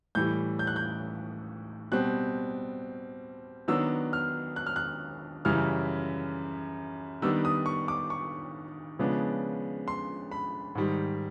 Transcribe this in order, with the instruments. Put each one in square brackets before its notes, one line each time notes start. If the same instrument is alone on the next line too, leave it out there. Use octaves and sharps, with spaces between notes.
[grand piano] A2 E3 G3 G6
G6
F#6
G6
B2 G3 C4 F#6
D#3 F#3 B3 D4 E6
F6
F#6
F6
F#6
F#2 C#3 E3 G3 F6
D#3 G3 B3 D4 E6
D#6
C#6
D6
C#6
C#3 F3 G#3 B3 D4
C6
B5
G#2 D#3 G3